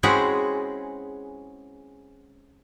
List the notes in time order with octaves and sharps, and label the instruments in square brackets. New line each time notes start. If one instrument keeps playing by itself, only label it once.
[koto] G#3 C4 C#4 E4 F#4 G#4